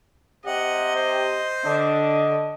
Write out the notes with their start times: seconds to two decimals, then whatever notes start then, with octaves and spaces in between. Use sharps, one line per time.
0.46 C3 G4 D#5 F#5
0.95 C5
1.65 D3 D4 D#5